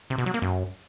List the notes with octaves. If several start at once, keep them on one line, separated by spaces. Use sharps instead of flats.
C3
B2
F#3
A#3
F#2